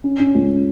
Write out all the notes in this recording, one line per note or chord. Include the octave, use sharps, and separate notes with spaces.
C#4
C#4
C#2